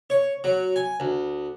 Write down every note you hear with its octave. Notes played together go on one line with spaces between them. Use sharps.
C#5
F#3
G#5
D2